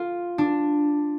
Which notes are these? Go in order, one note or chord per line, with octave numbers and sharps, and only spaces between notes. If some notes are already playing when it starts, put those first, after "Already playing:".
Already playing: F4
D4